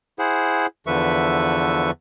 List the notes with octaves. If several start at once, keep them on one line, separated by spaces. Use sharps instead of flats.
E4 G#4 C5 F#5
E2 D3 F3 B4 E5 C#6